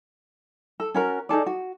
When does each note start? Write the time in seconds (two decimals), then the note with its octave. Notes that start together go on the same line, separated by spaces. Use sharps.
0.80 A4
0.94 C#4 F#4 A#4
1.29 D#4 G#4 A4 D5
1.46 F#4